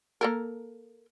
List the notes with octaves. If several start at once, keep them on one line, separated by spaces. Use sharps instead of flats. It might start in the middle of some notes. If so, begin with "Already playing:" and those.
A#3 A4 A#4